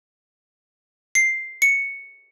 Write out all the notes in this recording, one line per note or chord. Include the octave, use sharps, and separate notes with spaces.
C7
C#7